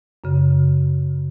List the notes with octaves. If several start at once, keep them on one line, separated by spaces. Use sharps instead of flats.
F#2 C#3